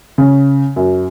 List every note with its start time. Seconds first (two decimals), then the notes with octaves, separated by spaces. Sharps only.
0.18 C#3
0.76 F#2